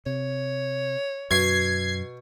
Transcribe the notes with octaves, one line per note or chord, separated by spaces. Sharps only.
C3 C#5
F#2 B2 G#6 C7